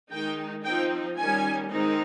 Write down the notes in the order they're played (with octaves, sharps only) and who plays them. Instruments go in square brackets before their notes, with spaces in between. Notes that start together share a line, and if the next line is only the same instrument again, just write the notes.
[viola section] D#3 G#3 D#4 G5
F3 C4 D#4 G5
D#3 G3 C#4 G#5
D#3 G#3 C4 D#4